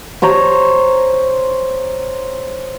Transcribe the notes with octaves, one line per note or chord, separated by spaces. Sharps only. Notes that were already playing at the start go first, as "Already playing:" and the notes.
C5 C#5 A#5